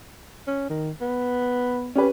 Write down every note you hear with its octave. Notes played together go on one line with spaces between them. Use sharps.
C#4
D#3
B3
C#4 G4 B4